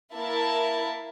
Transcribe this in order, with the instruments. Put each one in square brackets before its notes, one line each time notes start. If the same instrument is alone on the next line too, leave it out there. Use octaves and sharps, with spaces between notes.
[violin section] A#3 E4 A#4 E5 A5